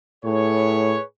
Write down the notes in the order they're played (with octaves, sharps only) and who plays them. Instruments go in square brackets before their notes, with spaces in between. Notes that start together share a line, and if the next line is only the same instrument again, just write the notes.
[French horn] A2 [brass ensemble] G#4 B4 C#5